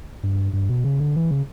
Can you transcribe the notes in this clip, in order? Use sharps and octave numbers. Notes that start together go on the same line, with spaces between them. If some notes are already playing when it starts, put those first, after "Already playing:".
G2
G2
B2
C#3
D3
E3
C#3